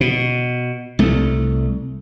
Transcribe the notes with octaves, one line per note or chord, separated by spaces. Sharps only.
B2
C2 A3